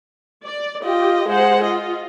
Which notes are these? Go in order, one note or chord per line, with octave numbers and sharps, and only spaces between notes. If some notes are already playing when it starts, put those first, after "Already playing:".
D5
F4 G4 D#5
G#3 C5 F#5
F4 D#5